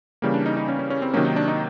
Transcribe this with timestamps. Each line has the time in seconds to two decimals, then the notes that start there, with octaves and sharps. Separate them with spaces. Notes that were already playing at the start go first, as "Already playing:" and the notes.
0.22 C#3 E3 G3 A#3
0.34 D4
0.46 D#4
0.57 D#4
0.68 C#4
0.79 C#4
0.90 C#4
1.02 C4
1.14 C3 D#3 F#3 A#3 C#4
1.25 D#4
1.36 D4
1.48 D#4